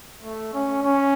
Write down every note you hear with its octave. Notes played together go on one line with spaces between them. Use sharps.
A3
C#4
C#4